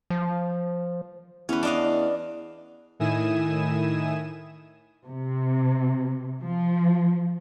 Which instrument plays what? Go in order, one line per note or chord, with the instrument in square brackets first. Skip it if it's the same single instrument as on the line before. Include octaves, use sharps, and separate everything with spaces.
[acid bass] F3
[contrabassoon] E2 [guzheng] C#4 B4
[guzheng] D4 D#5 F5
[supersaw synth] A2 D#3 E4 G#5 D#6 E7
[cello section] C3
F3